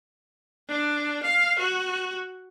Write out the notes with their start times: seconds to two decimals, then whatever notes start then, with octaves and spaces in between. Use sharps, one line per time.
0.68 D4
1.23 F5
1.59 F#4